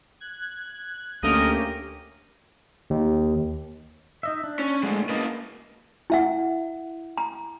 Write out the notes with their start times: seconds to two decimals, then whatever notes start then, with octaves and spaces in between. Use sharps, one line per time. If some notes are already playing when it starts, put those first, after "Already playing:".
0.20 F#6 G#6
1.23 D2 D3 A3 A#3 C#4 G4 A#4 D#5
2.90 D#2
4.23 D#4 D#5 E5
4.44 D4
4.59 C#4
4.83 A#2 D3 G#3 A3
5.09 C#3 A#3 B4 D#5 A5
6.10 E4 E5 F#5
7.17 A#5